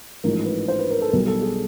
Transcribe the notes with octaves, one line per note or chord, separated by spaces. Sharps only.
A1 G#2 F3 A#4
B4
C5
B4
A#4
A4
B1 B2 G3 A#4
A4
G#4